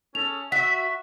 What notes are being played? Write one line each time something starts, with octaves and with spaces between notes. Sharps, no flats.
C#4 G#4 A4 F7
F#4 E5 B6